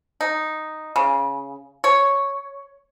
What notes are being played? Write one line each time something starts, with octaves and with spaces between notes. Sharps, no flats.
D#4
C#3
C#5